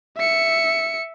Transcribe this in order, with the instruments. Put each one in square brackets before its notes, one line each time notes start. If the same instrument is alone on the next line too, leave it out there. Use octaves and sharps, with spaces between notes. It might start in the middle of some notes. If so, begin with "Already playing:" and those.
[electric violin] E5 C#7